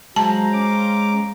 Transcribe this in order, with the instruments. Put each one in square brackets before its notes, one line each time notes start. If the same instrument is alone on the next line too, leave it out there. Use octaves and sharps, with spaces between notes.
[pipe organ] F#3 [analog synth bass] G#3 [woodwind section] C5 F5 A#5 [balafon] A5
[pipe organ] C#4 D6